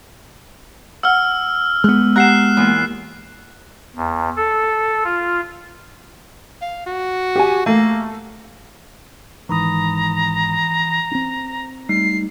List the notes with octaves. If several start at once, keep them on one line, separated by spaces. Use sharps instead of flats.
F#5 E6 F6
G#3 B3 F#6
G4 F#5 A#5 F#6 C7 E7
E2 A#2
E2
A4
F4
F5
F#4
G4 G#5
A3 A#3
G#1 G#2 D#3 E3 A#5 B5 D#6
C4 D4
G3 A3 D#4 C7